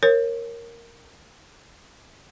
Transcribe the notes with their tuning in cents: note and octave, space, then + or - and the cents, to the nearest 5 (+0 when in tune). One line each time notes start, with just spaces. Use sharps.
A#4 +0 C#5 -25